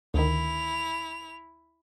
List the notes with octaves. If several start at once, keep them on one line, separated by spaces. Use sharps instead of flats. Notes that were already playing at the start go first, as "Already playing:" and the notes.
D2 D#3 E4 F7